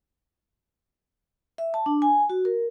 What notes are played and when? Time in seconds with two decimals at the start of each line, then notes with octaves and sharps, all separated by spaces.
1.58 E5
1.74 A5
1.86 D4
2.02 G#5
2.30 F#4
2.45 A#4